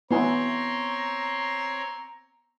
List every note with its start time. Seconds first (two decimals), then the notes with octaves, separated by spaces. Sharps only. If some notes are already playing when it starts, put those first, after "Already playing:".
0.11 B3 C4 E4 C#5 G#5 A#5 C6